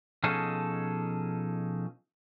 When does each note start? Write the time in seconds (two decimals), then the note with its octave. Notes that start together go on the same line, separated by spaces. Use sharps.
0.23 B2 F3 C#4 D#4 G#4 A4